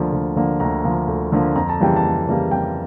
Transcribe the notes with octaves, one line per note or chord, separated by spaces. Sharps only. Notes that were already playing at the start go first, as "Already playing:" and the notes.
Already playing: D2 D3 F3 A#3
D2
D3 F3 A#3
D2 A#5
D3 F3 A#3
D2
D3 F3 A#3
F2 A#5
A5
C#3 E3 G3 A#3 G5
A5
F2
C#3 E3 G3 A#3
F2 G5